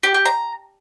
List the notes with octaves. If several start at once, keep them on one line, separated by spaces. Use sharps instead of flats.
G4
G4
A#5